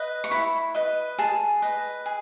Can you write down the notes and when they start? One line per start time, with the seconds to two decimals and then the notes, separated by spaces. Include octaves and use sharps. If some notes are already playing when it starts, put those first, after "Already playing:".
Already playing: B4 D#5
0.24 C#6
0.31 E4 B5
0.75 B4 D#5
1.18 G#4 A5
1.62 B4 D#5
2.06 G#4